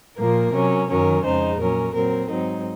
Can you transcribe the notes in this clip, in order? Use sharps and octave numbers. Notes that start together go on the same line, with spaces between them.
A#2 F3 A#3 A#4
C3 F#3 C#4
F#2 D#3 F#3 C#4 A#4
F2 C#3 G#3 D#4 C5
A#2 F#3 C#4 A#4
A#2 F#3 C4 A#4
G#2 F#3 C4 D#4